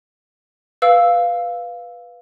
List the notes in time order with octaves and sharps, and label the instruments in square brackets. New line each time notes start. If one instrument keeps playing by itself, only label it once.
[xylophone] B4 F5 E6